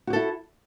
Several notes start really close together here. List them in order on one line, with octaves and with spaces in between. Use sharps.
F#4 G4 A4 E4